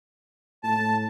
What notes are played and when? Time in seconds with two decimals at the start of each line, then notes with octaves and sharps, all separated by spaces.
0.63 A2 A5